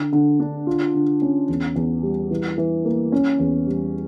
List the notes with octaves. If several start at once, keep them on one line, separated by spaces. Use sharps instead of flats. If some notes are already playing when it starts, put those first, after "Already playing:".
Already playing: D3
D3
D4
F4
D3
C#4
E2
E2
G3
E3
E3
A#3
C#4
E2
G3